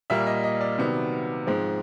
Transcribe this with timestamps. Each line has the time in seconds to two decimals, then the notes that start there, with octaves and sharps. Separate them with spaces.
0.10 A#2 G3 A#3 E5
0.27 D#5
0.44 D#5
0.61 D5
0.78 C3 D#3 F#3 B3
1.47 G#2 F3 G#3 C4